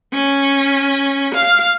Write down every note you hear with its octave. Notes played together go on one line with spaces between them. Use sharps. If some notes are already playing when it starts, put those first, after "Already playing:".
C#4
F5